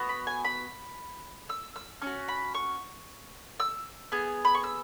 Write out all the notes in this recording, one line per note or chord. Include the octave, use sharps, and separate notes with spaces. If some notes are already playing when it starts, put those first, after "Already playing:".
Already playing: B3 F#4
B5
G#5
B5
E6
E6
C#4 F#4 C#6
B5
C#6
E6
B3 G#4
B5
C#6
E6